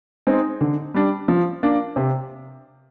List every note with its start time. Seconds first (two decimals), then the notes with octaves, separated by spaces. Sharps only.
0.27 G#3 C4 D#4
0.61 D3
0.94 G3 D4
1.28 F3
1.63 A#3 D4
1.96 C3